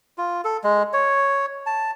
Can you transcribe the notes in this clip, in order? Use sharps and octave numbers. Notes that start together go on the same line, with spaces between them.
F4
A4
G#3
C#5
A5